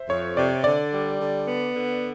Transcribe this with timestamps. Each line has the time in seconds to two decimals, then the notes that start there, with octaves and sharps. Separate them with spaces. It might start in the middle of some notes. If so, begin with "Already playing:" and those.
Already playing: C5 E5
0.09 F2 C#5
0.36 C3 D5
0.64 D3 D5
0.92 G3
1.18 D3
1.47 B3
1.74 D3